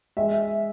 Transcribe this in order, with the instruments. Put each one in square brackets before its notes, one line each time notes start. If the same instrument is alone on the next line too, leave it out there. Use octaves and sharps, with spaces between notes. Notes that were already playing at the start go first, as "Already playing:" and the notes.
[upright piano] G#3 E5